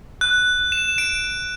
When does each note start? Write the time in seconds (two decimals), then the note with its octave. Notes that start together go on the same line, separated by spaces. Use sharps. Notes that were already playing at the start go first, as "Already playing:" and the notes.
0.21 F#6
0.72 E7
0.98 D7